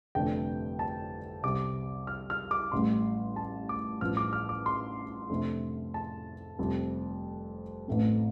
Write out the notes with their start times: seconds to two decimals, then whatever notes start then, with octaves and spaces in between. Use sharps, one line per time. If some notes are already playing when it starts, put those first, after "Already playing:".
0.15 G1 F2 C3 A3 D4 G5
0.79 A5
1.43 C2 C3 G3 D6
2.07 F6
2.30 F6
2.51 D6
2.72 A1 A2 G3 C6
3.36 A5
3.69 D6
4.01 A1 G2 F3 F6
4.17 D6
4.33 F6
4.49 D6
4.66 C6
5.30 F2 C3 A3 D4
5.94 A5
6.59 F1 F2 C3 G3 C4
7.88 A1 A2 A3 C4